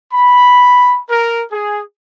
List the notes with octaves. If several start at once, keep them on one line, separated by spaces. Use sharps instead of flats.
B5
A#4
G#4